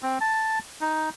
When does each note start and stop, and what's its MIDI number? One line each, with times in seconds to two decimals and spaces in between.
0.03 0.18 60
0.21 0.59 81
0.81 1.10 63